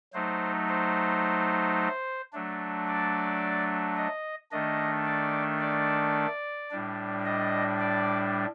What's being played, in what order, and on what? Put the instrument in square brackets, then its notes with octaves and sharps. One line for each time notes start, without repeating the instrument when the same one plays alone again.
[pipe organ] F#3 A3 D#4 C5
C5
F#3 A3 D4
D5
D#5
D#3 A3 D4 D#5
D5
D5
A2 G3 D4
D#5
D5